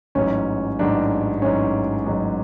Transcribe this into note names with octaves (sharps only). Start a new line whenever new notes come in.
A1 G#2 F#3 C#4
A1 G#2 F#3 D4
A1 G#2 F#3 C#4
A1 G#2 F#3